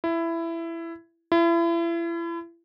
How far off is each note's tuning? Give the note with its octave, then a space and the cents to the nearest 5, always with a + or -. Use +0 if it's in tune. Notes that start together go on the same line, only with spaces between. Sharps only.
E4 +15
E4 +35